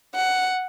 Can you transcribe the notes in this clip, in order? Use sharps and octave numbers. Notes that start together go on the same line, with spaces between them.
F#5